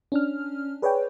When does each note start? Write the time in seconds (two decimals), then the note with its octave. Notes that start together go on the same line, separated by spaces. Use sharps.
0.12 C#4 D4 F6
0.82 G#4 B4 C#5 D5 G5